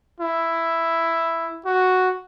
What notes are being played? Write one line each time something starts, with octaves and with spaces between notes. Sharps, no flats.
E4
F#4